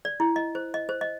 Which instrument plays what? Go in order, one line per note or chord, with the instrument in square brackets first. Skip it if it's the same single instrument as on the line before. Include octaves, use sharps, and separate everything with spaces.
[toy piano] D5
E4
D#5
C5
D#5
C5
D#5